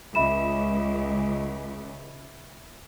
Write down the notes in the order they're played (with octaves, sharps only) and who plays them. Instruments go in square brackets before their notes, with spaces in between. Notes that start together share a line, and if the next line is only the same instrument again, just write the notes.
[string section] C#2 [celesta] E5 B5 E7